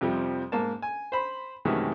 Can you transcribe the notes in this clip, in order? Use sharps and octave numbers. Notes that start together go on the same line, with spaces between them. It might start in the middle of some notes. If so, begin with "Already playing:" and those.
F2 C3 F3 G3
G#2 A#3 A5
G#5
C5 B5
F#2 C3 D#3 E3 G#3 A3